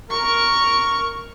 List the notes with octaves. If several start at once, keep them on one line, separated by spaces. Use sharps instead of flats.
A#4 C#6